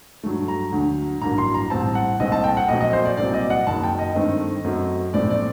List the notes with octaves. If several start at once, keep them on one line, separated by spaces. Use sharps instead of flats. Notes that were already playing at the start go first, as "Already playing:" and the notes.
G2 F#3 A3
A#5
D2 D3 F#3
A1 G2 F#3 A#3 A#5
C6
A#5
A1 A2 G3 C4 A5
F#5
C2 A#2 A3 C4 D#5
A5
G5
F#5
A#1 A#2 F#3 A3 C4 D#5
D#5
C5
D5
C2 A#2 F#3 C4 D5
D#5
F#5
F#1 F#2 D#3 F#3 A5
G5
D#5
G2 D#3 A3 C4
F#2 F#3 A3 C4
A#1 A2 A3 C4 D5
D5